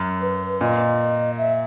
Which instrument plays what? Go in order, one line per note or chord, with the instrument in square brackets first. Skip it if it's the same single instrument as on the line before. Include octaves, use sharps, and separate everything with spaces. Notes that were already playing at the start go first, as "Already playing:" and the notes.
Already playing: [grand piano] F#2
[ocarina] B4
[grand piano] A#2 [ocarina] D#5
[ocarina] E5